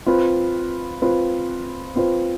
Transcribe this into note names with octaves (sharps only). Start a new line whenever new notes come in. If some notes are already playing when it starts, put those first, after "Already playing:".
C4 F4 B4
C4 F4 B4
C4 F4 B4